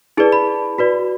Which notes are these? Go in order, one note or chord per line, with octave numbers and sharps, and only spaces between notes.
E4 G#4 B4 D5 A5
B5
F#4 B4 D5